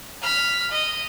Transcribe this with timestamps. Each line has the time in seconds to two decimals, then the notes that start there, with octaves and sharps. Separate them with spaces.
0.22 B5 F6
0.71 D#5